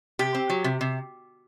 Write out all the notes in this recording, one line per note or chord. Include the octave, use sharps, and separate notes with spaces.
C3 G4
C4
F#3
C3
C3